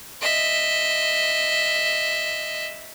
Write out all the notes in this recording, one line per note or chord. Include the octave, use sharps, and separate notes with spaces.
D#5 E5